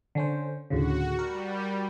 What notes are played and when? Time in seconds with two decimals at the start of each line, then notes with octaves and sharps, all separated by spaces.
0.15 D3 C#4 C5
0.70 D2 A2 C#3 F#4
1.19 G3 A#4